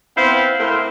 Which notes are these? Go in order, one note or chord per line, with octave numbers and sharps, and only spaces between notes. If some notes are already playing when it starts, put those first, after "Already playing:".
B3 C4 E4 C5 F5
A2 E4 A#4 C5